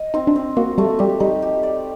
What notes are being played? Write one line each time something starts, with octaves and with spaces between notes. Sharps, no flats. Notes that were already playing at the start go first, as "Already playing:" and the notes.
Already playing: D#5
C4 D#4
D4
C4
A#3 F#4
G3 A3
G3 G4
G3 D#4
G4
D5